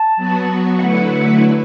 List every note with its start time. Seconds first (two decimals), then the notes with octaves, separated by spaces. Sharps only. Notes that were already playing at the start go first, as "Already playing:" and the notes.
Already playing: A5
0.16 F#3 B3 F#4
0.79 D3 F#3 A3 E4 B4 F#5